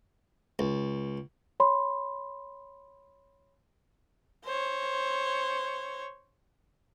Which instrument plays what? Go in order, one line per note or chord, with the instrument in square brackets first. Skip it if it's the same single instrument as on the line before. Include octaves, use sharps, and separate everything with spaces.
[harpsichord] C#2
[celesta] C#5 B5 C6
[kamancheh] C5 C#5